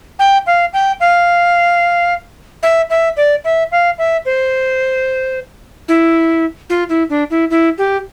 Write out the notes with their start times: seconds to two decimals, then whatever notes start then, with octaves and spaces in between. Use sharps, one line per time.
0.19 G5
0.47 F5
0.73 G5
1.00 F5
2.63 E5
2.90 E5
3.17 D5
3.45 E5
3.72 F5
3.98 E5
4.26 C5
5.88 E4
6.70 F4
6.89 E4
7.10 D4
7.31 E4
7.51 E4
7.78 G4